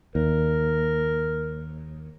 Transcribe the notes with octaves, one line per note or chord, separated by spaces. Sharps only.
D#2 A#4